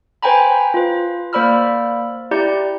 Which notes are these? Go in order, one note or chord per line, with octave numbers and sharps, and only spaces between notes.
B4 C5 G5 G#5 A#5 B5
F4 B4
A#3 C5 D5 B5 E6 F6
E4 G4 D5 A#5 G6